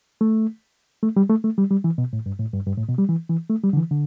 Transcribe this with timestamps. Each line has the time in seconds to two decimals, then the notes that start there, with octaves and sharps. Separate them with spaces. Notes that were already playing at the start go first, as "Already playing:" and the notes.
0.21 A3
1.03 A3
1.17 G3
1.29 A3
1.44 A3
1.58 G3
1.71 G3
1.84 E3
1.98 B2
2.13 A2
2.26 G2
2.40 A2
2.54 G2
2.67 G2
2.77 A2
2.88 B2
2.98 G3
3.09 E3
3.29 E3
3.50 A3
3.63 G3
3.73 D3
3.77 E3
3.91 D3